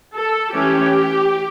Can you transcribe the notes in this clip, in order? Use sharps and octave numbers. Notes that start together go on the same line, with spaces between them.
A4
E3 A3 C#4 G4